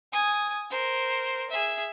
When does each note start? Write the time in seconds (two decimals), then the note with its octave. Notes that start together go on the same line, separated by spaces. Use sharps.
0.12 G#5 D#6
0.70 A#4 C5
1.50 G#4 E5